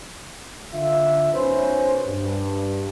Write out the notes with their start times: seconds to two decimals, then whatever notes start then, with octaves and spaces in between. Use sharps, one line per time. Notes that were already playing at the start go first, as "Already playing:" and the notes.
0.73 D3 F4 E5
1.33 B1 C#4 B4 C5
2.06 G2